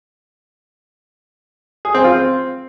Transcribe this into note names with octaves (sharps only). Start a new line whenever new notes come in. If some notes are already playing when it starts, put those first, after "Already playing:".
G#4
C4
F4
C4